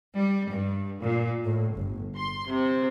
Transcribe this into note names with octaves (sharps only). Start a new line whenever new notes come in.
G3
G2
A#2
A2
G1
C6
C3